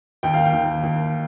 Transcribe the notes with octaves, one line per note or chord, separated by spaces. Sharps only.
D#2 G5
F5
G5
D#2
D#2